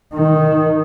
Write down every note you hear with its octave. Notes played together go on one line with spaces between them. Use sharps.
D#3